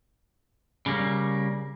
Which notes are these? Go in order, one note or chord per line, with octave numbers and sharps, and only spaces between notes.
C#3 G3 A#3